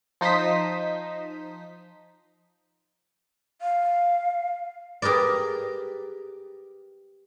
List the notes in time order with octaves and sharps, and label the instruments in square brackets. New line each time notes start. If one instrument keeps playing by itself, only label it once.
[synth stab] F3 D#4 C5 D#6 B6
[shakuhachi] F5
[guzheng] G4 G#4 A#4 B4 D5